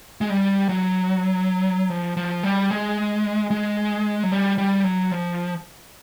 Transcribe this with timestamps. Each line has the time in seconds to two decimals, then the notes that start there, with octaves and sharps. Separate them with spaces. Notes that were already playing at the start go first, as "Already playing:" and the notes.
0.21 G#3
0.30 G3
0.69 F#3
1.90 F3
2.17 F3
2.43 G3
2.71 G#3
3.51 G#3
4.23 F#3
4.32 G3
4.58 G3
4.84 F#3
5.11 F3